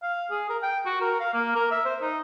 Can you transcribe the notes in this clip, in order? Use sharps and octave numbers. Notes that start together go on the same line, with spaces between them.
F5
G#4
A#4
G5
F#4
A#4
F5
A#3
A#4
E5
C5
D#4